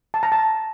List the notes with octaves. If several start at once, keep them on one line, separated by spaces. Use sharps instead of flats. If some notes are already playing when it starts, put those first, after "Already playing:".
A5
A#5
A5